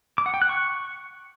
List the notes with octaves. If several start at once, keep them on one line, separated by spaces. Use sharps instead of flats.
D6
F#5
G5
F#6
C#6